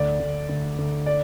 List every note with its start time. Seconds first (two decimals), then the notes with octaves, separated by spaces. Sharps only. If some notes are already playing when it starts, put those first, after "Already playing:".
Already playing: D2 D5
0.20 D2
0.49 D2
0.78 D2
1.06 D5